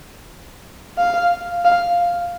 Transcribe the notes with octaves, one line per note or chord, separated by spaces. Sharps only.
F5
F5